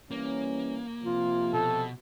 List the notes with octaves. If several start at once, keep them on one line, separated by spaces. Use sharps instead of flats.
E3 G3 A#3 C#4
C3 F3 F4
B2 A4